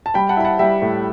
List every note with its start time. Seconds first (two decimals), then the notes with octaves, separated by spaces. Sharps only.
0.06 A5
0.14 G3 G5 B5
0.29 F#5 A5
0.37 E4 B5
0.45 F#5 A5
0.59 G3 E5 G5
0.82 A2